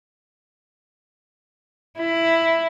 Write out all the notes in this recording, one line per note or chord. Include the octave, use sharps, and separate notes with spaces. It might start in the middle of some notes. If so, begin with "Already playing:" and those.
E4